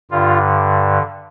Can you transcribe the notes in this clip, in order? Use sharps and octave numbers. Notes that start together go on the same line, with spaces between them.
G2 D3 F4